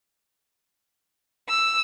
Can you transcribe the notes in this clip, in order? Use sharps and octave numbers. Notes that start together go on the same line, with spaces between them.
E6